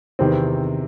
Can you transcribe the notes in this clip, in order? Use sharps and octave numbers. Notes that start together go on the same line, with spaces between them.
E2 C3 D#3 C4